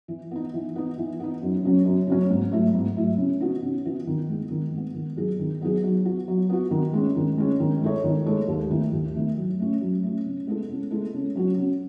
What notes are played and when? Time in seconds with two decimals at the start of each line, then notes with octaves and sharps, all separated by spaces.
0.08 E3
0.31 B3 D#4
0.54 E3
0.76 B3 D#4
0.98 E3
1.20 B3 D#4
1.42 F#2
1.63 C#3 F#3 C#4
1.85 F#2
2.07 C#3 F#3 C#4
2.30 G#2
2.52 F#3 A3 E4
2.74 G#2
2.96 F#3 A3 E4
3.18 C#3
3.40 E3 B3 D#4 F#4
3.62 C#3
3.85 E3 B3 D#4 F#4
4.07 D#3
4.29 G#3 B3
4.50 D#3
4.73 G#3 B3
4.94 D#3
5.16 F#3 B3 D#4 G#4
5.39 D#3
5.61 F#3 B3 D#4 G#4
5.84 F#3
6.05 B3 F#4
6.28 F#3
6.49 B3 F#4
6.71 D#3
6.93 G#3 C#4
7.16 D#3
7.38 G#3 C#4
7.60 D#3
7.82 G#3 D#4 A4 C#5
8.04 D#3
8.26 G#3 D#4 A4 C#5
8.48 D#2
8.70 D#3 A3 E4
8.93 D#2
9.14 D#3 A3 E4
9.37 F#3
9.59 A3 C#4
9.81 F#3
10.03 A3 C#4
10.26 C#3
10.47 G#3 B3 E4 A4
10.69 C#3
10.91 G#3 B3 E4 A4
11.14 C#3
11.35 F#3 C#4 F#4
11.58 C#3